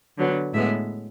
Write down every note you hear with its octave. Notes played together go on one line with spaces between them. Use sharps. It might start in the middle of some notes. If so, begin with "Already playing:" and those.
D3 F#3 B3
A2 G#3 B3 E5